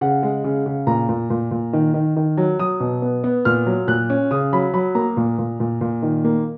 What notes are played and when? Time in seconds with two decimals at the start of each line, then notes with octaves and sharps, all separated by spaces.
0.01 C#3 F#5
0.23 G#3
0.44 C#3
0.66 C#3
0.87 A#2 A#5
1.09 A#2
1.30 A#2
1.51 A#2
1.73 D#3
1.94 D#3
2.16 D#3
2.37 F#3
2.59 F#3 D#6
2.80 B2
3.02 B3
3.24 B3
3.45 A#2 F6
3.66 F#3
3.88 A#2 F#6
4.10 C#4
4.31 C#3 D#6
4.53 F#3 B5
4.74 F#3 B5
4.95 A#3 A#5
5.17 A#2
5.39 A#2
5.60 A#2
5.81 A#2
6.02 D#3
6.24 A#3